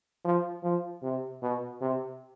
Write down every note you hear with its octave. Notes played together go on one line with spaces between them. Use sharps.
F3
F3
C3
B2
C3